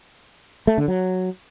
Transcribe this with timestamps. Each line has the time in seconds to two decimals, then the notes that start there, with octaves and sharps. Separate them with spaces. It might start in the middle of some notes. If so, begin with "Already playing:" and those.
0.67 A3
0.78 D3
0.88 F#3